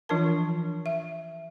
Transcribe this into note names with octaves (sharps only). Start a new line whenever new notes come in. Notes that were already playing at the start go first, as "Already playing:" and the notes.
E3 F3 D4 F4 A#4 A5
E5